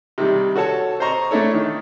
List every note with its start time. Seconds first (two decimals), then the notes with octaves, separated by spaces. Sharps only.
0.18 C3 D#3 G3
0.55 F#4 A4 C#5 A5
1.00 C5 D#5 A#5 C#6
1.31 A3 D4 E4 A4 C#5
1.54 D#3